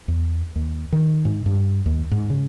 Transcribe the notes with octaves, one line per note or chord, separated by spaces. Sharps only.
E2
D#2
D#3
G#2
G2
D#2
G#2
C#3